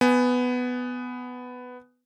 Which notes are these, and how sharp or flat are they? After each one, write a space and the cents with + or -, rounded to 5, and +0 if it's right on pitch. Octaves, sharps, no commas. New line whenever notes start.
B3 +10 G#5 +0